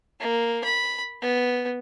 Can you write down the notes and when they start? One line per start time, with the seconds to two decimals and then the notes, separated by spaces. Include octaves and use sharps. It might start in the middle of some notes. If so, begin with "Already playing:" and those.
0.20 A#3
0.64 B5
1.22 B3